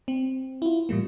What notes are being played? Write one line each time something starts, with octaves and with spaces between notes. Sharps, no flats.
C4
E4 F4
A2 E3 G3 A#3